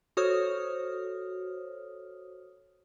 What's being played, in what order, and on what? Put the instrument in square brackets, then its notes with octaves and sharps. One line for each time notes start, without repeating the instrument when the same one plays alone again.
[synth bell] F#4 A4 C5 C#5 D#6 F6